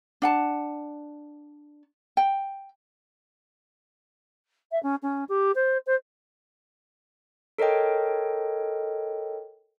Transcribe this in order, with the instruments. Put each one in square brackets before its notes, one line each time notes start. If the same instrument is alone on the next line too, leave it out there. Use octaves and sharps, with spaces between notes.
[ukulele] D4 F#5 A5
G5
[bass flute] E5
C#4
C#4
G4
C5
C5
[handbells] A4 A#4 C#5 D#5 G5